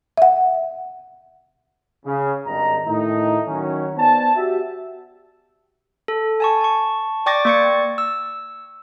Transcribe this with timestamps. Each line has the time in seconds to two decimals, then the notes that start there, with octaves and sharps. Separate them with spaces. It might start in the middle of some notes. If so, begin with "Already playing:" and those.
0.17 E5 F#5
2.06 C#3
2.46 G#1 G2 D#3 D#4 A#5
2.87 A2 D#3 A3 D#4
3.46 D#3 F#3 C#4
3.97 B3 C5 D5 G#5 A5
4.36 F#4 G4 E5
6.08 A4
6.40 G#5 A5 C#6
6.61 A5 C#6
7.26 D5 G5 C#6 D6 A6 A#6
7.45 A#3 D5 C#6 G#6 C#7
7.98 E6